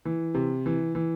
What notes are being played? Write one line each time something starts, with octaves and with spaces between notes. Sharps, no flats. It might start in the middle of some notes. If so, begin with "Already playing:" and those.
E3
C3
E3
E3